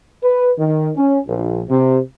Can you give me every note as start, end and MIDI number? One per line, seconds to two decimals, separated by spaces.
0.23 0.49 71
0.58 0.90 51
0.96 1.18 61
1.26 1.62 34
1.68 1.98 48